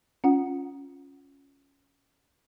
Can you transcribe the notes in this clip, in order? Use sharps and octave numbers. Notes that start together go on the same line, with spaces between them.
C#4 F4 F#5